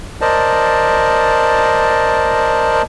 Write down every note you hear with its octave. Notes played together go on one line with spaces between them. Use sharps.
A#4 C5 D5 D#5 A5